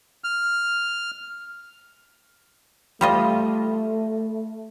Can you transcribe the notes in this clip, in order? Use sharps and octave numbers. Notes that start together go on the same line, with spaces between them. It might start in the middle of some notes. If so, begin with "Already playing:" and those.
F6
G3 A3 F4 D#5